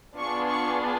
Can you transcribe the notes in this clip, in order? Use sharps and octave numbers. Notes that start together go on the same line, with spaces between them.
B3 D4 F4 G#4 C#6
C#6